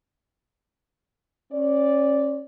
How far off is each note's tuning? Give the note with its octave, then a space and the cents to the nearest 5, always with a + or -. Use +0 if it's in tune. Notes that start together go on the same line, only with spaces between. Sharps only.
C#4 -30 D5 -5